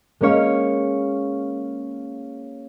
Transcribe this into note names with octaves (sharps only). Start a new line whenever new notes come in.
G#3 A#3 C#4 C#5 F5